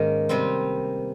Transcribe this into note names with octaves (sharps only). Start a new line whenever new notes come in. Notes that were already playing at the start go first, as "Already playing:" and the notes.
Already playing: G#2 D#3 A#3 C#4 A#4
C3 G3 C4